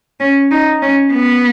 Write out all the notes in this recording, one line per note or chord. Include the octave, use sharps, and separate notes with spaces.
C#4
D#4
C#4
B3